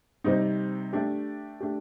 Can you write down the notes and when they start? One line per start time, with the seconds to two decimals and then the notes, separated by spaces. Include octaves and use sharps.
0.24 C3 G3 C4 D#4
0.93 A3 D4 G4
1.60 A3 D4 G4